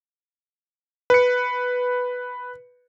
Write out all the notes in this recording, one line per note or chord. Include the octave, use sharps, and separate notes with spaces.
B4 C#7